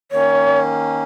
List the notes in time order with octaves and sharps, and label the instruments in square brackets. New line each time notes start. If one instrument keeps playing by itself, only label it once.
[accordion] D#3 A#3 C#4 [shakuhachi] C#5